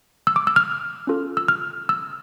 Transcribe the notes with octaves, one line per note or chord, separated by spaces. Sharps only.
E6
D6
E6
F6
C#4 F4 A4
E6
F6
E6